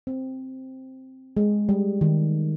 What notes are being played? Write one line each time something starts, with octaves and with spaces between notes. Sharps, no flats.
C4
G#3
G3
D#3